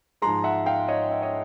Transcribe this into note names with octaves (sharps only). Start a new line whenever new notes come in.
G#2 F3 G#3 A#5 C6
E5 F#5
F5 G5
C#5 D#5
E5
C#5 D#5